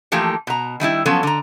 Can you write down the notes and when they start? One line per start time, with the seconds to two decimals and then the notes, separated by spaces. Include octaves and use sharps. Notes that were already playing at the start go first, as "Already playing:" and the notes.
0.12 E3 F3 A3 A#3 F4 G4
0.47 B2 A#5
0.80 D#3 G3 D#4 E4
1.06 F3 F#3 B3 C#4 A4
1.23 D3 A#5